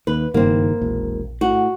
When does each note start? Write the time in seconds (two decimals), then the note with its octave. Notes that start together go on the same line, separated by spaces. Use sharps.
0.07 D#2 B4
0.34 F#1 G2 D#3 A#3 C4
0.81 E1 A#1
1.41 A2 F#4